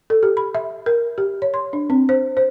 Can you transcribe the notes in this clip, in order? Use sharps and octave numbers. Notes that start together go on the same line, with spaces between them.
A4
G4
B5
E5
A#4
G4
C#5
C6
D4
C4
C5
C5